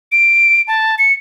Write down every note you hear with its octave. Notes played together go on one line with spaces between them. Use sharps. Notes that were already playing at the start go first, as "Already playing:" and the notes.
D7
A5
C#7